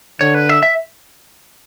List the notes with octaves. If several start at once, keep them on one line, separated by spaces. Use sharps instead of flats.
D3 C#5
B4
E5
E5